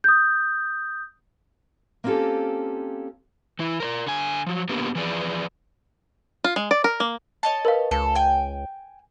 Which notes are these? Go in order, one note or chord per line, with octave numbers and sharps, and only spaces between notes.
D#6 G6
A#3 C4 C#4 F4 G4 A4
E3 E4
A#4 C5 D5
D3 G#5
F3 F#3
A#3 B3 D4 G4 A#4 B4
E3 F3 G#4 B4 D5
F4
G#3
D5
A#4
A#3
C#5 D#5 A5
A#4 B4 F5
C#2 A4
G5 G#5